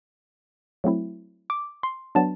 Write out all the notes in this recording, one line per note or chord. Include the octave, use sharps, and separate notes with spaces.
F#3 A3 C4 E4
D6
C6
F#3 B3 D4 A5